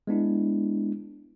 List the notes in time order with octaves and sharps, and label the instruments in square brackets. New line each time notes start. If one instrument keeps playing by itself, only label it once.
[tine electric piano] G#3 B3 D4 E4